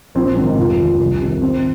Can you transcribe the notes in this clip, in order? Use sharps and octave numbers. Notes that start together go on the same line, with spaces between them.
A#1 C4
C4
G#2 D#3 C4
D#4
F1 F4
D#2 D#3
C2
C3 D#3
G#1 C4